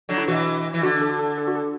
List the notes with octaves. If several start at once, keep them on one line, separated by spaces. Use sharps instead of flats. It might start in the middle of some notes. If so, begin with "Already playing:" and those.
D3 F#3
E4
B2 E3 F#4
E3
D3 F#4
A4
A4
A4
F#4
A4